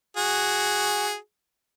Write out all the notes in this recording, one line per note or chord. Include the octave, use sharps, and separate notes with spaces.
F#4 G#4